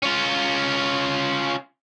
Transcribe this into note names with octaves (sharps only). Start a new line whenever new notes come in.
C#4 F4